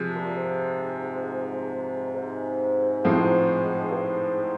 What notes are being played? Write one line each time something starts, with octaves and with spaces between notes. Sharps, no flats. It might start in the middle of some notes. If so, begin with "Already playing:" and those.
Already playing: C3 F3 G#3
A#2
G#2
G#2
A2 F3 G#3 C4
G2
G#2